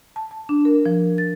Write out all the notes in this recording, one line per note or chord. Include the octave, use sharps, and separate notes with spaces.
A5
A5
D4
A#4
F3
A6